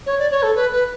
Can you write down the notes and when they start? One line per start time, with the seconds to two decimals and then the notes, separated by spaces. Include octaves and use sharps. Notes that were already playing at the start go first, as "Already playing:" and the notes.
0.06 C#5
0.19 D5
0.31 C#5
0.43 A4
0.55 B4
0.72 B4